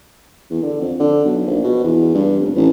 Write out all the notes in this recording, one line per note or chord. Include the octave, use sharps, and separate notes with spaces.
E2
D3
F2
D3
B1
A#1
B2
E2
G2
F1
A1